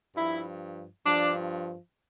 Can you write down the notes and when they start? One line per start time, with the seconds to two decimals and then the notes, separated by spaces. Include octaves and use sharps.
0.15 G2 F3 E4
1.05 G2 F3 D4